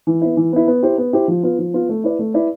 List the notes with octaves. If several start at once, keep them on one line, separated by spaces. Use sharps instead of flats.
E3
B3 E4
E3
B3 E4
B3
E4 G4 C5
B3
E4 G4 C5
F3
B3 F4
F3
B3 F4
A3
E4 B4 D5
A3
E4 B4 D5